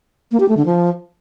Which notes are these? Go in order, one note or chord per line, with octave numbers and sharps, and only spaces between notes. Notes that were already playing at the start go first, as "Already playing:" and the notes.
A#3
G4
A3
D3
F3